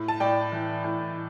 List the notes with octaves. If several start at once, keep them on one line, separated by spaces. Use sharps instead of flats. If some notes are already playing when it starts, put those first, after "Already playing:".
Already playing: A2
A5
A2 D5 G5
E3
A2